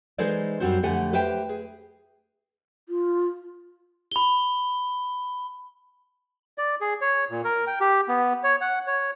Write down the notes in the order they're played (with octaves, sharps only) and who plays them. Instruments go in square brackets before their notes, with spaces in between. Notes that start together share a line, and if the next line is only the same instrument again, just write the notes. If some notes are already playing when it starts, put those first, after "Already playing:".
[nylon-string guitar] E3 G#3 D#4 A4 C5 D5
F#2 G3 C4 F#4 C5
F2 D3 A3 G4 F#5 G#5
G4 B4 C5 E5 G5
G#4
[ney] F4
[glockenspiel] B5 G7
[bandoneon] D5
G#4
C#5
A#2
A#4
G5
G4
B3
C#5
F#5
C#5